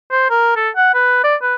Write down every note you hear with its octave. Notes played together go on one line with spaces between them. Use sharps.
C5
A#4
A4
F#5
B4
D5
B4